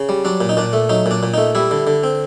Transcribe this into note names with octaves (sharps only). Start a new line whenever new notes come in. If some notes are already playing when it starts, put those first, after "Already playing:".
Already playing: C#3
G3
F#3 D4
A#2
D#4
A#2 D4
A3
F#3 D#4
A#2 D4
A#2
A3 D#4
G3 E4
D3
D3
C4